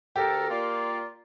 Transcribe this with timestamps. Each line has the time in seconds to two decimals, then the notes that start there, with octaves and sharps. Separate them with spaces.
0.16 D2 G4 A4 A#4
0.49 A#3 F4 D5